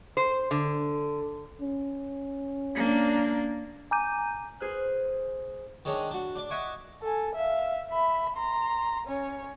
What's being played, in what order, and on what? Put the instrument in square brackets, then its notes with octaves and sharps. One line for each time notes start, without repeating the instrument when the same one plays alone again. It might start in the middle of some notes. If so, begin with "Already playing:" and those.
[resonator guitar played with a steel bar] C5
D3
[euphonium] C#4
[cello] A#3 D4
[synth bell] G#5 A#5 D6 G6 D#7
[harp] G#4 B4 C5 F6 F#6
[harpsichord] D#3 G#3 C#4 D4
D4 F#4
D4 D5
D#5 E5 F#5 G#5 C#6 D6
[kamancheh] A4 G#5
E5 F5
E5 B5
A#5 C6
C#4 C#5